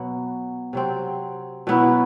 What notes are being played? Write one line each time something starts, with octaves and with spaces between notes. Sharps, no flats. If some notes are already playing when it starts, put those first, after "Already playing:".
Already playing: B2 F#3 B3
C3 F#3 C4
B2 F#3 B3 E4